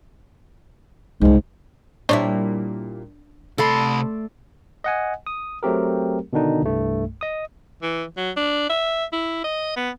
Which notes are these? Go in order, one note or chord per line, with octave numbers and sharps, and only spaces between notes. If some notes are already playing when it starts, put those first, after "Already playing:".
C2 G#2 C#3
A#2 G3 D4 E4 C5 C#5
C3 A3 A4 D5 B5 C6
D#5 F#5 G#5
D#6
F#3 A3 C4 G4 A#4
B2 D3 D#3 D4 D#4
C2 G2 A3
D#5 D#6
E3
F#3
D4
E5
E4
D#5
B3